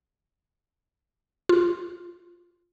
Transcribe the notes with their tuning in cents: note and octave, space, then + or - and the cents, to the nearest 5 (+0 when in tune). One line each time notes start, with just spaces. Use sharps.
F4 +0